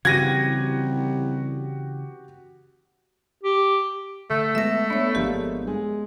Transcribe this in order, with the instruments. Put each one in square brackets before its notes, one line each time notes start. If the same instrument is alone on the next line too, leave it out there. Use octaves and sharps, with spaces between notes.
[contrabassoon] C2 [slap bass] C#3 E3 [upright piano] F#4 G4 D#7 [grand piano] G#6 A#6
[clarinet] G4
[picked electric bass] D3 [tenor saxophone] A3
[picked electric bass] G#3 [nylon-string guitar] B3 A4 [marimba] E5 A#6
[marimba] B3 C#5 [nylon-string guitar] D4
[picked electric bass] G#1 F3 [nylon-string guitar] G#3 A#3 D4 [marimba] G4
[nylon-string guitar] G#3